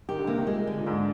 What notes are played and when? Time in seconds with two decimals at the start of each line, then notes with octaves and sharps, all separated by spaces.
0.09 D#3 G4
0.18 D3
0.27 C3 A#3
0.38 D#3
0.47 A#2 G#3
0.67 D3
0.78 A#2
0.86 G#2 D4